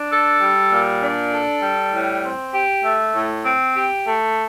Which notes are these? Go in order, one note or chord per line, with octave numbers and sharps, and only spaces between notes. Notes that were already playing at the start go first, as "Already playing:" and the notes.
Already playing: D4
A4
G3
A#2
D4
A4
G3
A2
C4
G4
A3
A2
C4
G4
A3